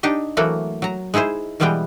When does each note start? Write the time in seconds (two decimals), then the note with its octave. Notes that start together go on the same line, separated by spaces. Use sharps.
0.03 D4 D#4 G4 D#5
0.37 E3 F#3 A3 A#3 F#4
0.82 F#3 A#5
1.14 G#3 D#4 E4 G#4 C5
1.60 B2 E3 G3 G#3 B3 G5